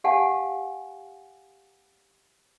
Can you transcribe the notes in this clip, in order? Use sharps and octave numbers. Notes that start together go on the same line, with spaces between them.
G4 F5 F#5 G#5 A5